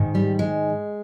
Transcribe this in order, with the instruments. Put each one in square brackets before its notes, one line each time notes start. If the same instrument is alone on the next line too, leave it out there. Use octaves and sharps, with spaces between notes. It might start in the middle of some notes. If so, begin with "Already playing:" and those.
Already playing: [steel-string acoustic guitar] G#2 D#3
G3
G#3